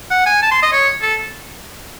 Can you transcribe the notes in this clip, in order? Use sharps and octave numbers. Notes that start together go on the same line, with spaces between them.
F#5
G#5
A5
C6
D#5
C#5
A4